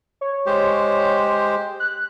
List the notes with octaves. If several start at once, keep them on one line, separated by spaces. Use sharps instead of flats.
C#5
G#3 G4 C5
F#6